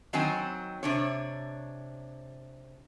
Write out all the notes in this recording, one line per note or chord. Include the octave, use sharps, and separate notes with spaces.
D#3 F#3 C4 G#5
C3 D4 C#5